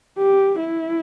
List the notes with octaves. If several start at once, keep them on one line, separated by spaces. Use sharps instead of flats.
G4
E4